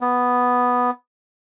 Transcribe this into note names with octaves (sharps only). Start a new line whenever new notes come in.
B3